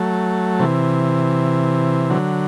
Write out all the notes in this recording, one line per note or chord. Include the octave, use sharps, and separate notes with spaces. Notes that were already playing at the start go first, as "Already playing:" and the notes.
Already playing: F#3 A3
C3 E3
D3 F#3